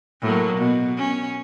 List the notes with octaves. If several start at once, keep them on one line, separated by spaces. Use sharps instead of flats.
A2 F#3 A#3
B2
C#4